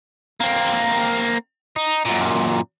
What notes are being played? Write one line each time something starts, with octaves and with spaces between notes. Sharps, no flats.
A#3 C4
D#4
F#2 A#2